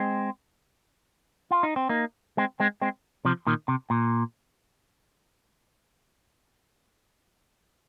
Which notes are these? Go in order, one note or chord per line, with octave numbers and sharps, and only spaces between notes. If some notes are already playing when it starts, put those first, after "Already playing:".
Already playing: G#3 C4
F4
D#4
C4
A#3 D#4
G#3 C4
G#3 C4
G#3 C4
C3 F3
A#2 D#3
C3
A#2